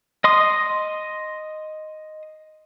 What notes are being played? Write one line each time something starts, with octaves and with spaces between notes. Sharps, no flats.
D#5 C6 D#6